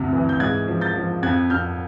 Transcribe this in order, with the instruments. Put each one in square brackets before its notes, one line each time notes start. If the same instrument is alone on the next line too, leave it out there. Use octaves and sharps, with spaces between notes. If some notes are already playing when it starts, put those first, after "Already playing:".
Already playing: [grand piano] D2 G2 C3
E3
G6
G#2 F#6 G#6
F3
G6 A6
F3
F2 F#6 G#6
F2 F6 G6